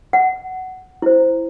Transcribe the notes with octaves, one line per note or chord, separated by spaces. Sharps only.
F#5
E4 C5